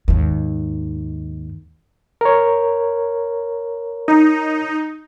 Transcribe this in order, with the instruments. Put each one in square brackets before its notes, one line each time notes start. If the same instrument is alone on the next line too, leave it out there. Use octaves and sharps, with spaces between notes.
[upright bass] D#2 G#2
[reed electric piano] A#4 C#5
[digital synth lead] D#4